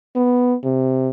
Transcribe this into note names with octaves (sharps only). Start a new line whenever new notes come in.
B3
C3